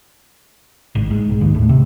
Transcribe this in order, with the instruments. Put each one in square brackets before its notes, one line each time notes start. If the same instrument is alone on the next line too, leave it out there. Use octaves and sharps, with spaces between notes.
[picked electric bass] G#1
G#2
B1
D#2
A2
C3